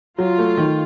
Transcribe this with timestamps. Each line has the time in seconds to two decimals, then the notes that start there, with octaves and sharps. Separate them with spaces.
0.18 F#3 F4
0.38 A3
0.57 D#3